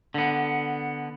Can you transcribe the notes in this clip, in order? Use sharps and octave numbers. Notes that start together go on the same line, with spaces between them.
D3 B3